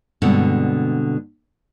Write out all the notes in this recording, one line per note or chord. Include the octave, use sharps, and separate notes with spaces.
G2 B2 D3 G#3 C4